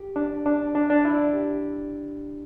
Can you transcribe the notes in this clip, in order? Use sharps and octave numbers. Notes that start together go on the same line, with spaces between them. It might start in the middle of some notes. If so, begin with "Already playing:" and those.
Already playing: G4
D4
D4
D4
D4
E4
G4